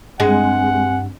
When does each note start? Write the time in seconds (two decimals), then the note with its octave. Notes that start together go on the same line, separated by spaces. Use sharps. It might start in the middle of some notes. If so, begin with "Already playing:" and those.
0.20 G2 G#3 C4 F#5 G#5